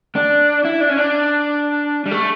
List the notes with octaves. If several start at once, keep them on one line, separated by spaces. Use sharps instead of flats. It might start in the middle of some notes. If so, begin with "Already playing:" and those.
D4
E4
D4
C#4
D4
G3
A3